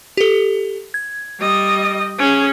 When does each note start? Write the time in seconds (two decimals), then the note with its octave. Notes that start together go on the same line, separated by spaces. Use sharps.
0.17 G4 A4
0.94 G#6
1.40 G3 D#5
2.19 C#4 G#4